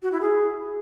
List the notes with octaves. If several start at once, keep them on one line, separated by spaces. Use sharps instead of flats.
F#4
E4
G#4